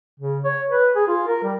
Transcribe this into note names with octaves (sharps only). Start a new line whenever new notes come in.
C#3
C#5
B4
G#4
F4
A#4
G3